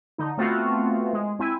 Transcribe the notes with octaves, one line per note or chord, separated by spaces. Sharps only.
D3 D#4
A3 B3 C4 F4 F#4
G#3
C4 E4 G#5